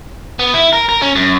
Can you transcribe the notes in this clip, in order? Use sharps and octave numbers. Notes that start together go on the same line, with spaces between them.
B3
E4
A#4
A#4
C#4
F#2